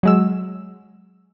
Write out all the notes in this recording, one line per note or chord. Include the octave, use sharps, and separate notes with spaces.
F#3 G#3 E6